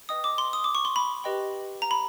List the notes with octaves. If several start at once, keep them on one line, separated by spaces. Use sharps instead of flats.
B4 D#5 G5 D#6
D6
C6
D#6
D6
C#6
C6
B5
G4 B4 D#5 G5
A#5
B5